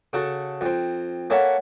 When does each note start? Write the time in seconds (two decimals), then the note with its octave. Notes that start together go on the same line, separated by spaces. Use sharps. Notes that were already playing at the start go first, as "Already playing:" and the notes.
0.13 C#3 F#4 A4
0.61 F2 C4
1.30 A#3 C#4 A4 E5 F#5 C#6